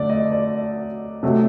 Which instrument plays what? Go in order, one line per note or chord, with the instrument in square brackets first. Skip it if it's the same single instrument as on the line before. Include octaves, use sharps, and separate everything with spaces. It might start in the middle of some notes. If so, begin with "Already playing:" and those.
Already playing: [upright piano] D3 F#3 A3 D5
D#5
D5
C3 F#3 A3